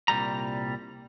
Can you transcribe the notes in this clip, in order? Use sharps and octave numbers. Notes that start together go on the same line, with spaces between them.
C2 A#2 G3 A#5